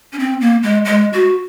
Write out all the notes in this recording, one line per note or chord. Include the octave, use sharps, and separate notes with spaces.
C#4
C4
A#3
G#3
G#3
F#4